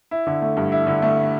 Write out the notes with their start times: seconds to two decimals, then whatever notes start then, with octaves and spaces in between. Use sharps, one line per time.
0.11 E4
0.27 D3
0.42 A3
0.57 G2
0.72 E4
0.87 D3
1.02 A3